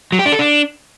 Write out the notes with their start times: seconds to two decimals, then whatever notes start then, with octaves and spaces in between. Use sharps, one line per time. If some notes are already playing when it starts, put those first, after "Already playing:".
0.12 F#3
0.19 G4
0.26 D4
0.32 A4
0.39 D4